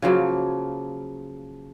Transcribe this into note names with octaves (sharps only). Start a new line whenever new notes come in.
C#3 F3 F#3 A#3